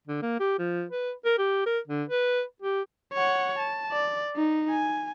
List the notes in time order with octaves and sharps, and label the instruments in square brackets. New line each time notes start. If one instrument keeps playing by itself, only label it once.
[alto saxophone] D3
A#3
G4
F3
B4
A#4
G4
A#4
D3
B4
G4
[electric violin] C#5 F#5
A5
D5
D#4
G#5